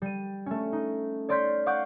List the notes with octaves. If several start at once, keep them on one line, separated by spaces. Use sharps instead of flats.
G3 D#7
A3 C#4
D#4
C#5 D5 C6 F6 G6 B6
F5 F#5 C#6 D6 F#6 G6